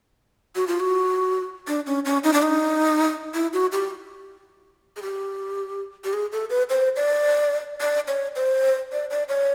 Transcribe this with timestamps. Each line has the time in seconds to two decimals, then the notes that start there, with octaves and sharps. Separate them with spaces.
0.56 F#4
0.67 F4
0.80 F#4
1.68 D4
1.87 C#4
2.05 C#4
2.24 D#4
2.34 D4
2.43 D#4
3.34 E4
3.53 F#4
3.72 G4
4.96 G#4
5.02 G4
6.04 G4
6.13 G#4
6.32 A4
6.50 B4
6.70 C5
6.96 D5
7.80 D5
8.08 C#5
8.36 C5
8.92 D5
9.11 D5
9.29 C#5